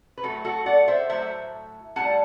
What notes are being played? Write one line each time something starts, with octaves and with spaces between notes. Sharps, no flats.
B4
A2 F#3 A3 F#4 A4
F#4 A4
D5 F#5
C5 E5
A2 F#3 A3 C5 E5
A2 G3 F#5 A5